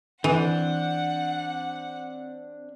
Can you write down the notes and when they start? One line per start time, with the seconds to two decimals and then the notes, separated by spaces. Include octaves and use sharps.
0.24 E3 C4 D4 F#5